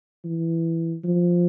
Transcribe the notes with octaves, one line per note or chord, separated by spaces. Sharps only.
E3
F3